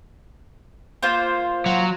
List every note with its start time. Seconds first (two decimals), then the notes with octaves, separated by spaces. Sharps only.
1.03 A#3 F4 C5
1.66 F#3